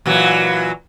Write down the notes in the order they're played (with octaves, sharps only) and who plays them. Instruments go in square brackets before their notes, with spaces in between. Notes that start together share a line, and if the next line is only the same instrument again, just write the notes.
[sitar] A#2 E3 F#3